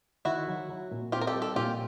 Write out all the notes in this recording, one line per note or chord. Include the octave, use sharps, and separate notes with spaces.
D#3 E4 F#4
F#3
F#3
A#2
C4 F4 G4
A#4
G4 A4
G3
G4 A4
A#2 F4 G4